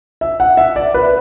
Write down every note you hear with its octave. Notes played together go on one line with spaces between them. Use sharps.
E5
F#5
E5
D5
B4